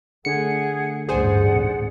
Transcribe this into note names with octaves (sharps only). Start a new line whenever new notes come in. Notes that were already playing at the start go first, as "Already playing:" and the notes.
D3 A3 G#4 F#5 C#7
A1 D2 G2 G#4 C5 D5 F#5 G#5
G#2 C3